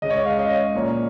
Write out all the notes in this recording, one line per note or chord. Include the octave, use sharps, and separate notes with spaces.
C#2 C#3 G#3 C#4 D#5
C#5
D#5
F5
D#5
C#5
A#2 F3 A#3 C#4